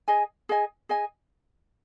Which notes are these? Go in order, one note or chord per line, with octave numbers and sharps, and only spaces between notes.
G#4 D#5 G#5
G#4 D#5 G#5
G#4 D#5 G#5